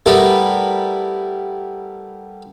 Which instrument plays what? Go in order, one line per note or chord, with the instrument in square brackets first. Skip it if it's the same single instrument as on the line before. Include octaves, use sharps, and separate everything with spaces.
[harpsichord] G3 A3 B3 E4 A4 A#4